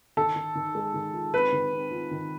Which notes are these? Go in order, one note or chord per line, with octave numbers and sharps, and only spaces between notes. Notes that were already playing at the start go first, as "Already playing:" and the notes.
D#3 A4
D#3
D#3
G#3
D#3
F4
C4 B4
D#3
C4
F4
D#3